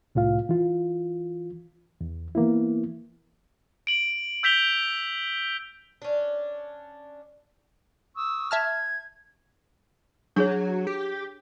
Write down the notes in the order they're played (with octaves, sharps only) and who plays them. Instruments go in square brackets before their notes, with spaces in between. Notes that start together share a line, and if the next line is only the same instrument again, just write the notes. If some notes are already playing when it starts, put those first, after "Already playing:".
[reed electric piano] C2 A2 F4 F5
E3 F4
E2
E3 A#3 B3 E4
[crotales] D7 F#7
E6 G6 B6 F7 G7
[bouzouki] C#4 D4
[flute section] C#6 D#6 E6
[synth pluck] E5 A5 F6 [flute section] G#6
[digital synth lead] F#3 [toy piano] D4 G#4 C#5
[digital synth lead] G4